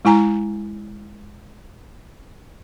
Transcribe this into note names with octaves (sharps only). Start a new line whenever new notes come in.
G#3 E4 G#5 A#5